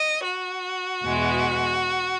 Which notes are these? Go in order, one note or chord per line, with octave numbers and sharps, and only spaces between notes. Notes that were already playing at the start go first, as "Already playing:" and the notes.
Already playing: D#5
F#4
E2 B2 G#3